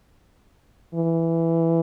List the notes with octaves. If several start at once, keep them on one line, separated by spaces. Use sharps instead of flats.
E3